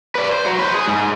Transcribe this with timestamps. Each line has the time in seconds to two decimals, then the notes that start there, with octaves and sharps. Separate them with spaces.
0.15 B4 D5
0.33 C5
0.46 F#3
0.59 B4 C5
0.74 G#4
0.88 G#2